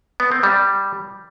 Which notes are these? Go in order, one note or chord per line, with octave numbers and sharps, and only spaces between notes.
B3
C4
G3